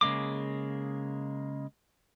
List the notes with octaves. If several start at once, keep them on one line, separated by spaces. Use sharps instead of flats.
C#3 G#3 A#3 D6